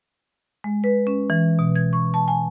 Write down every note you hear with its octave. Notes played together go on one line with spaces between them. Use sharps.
G#3
B4
C#4
E3
B2
G#6
C#6
A5
G#5